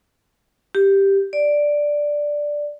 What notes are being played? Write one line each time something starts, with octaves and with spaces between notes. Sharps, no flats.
G4
D5